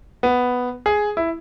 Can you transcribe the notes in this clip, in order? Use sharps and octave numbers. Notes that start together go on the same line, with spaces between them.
B3
G#4
E4